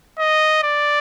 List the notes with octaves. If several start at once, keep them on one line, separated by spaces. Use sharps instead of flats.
D#5
D5